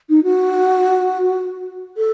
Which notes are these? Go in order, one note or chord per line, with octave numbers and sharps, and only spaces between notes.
D#4
F#4
A4